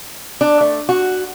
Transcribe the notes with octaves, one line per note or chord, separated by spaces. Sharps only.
D4
A3
F#4